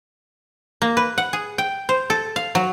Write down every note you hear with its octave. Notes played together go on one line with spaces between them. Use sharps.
A#3
B4
F#5
G#4
G5
C5
A4
F5
F#3